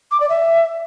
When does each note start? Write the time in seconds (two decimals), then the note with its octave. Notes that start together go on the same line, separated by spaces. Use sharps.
0.11 D6
0.20 D5
0.29 E5